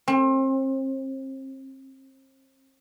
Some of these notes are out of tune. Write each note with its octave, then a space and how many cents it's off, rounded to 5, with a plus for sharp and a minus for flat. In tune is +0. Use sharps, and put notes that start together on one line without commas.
C4 +35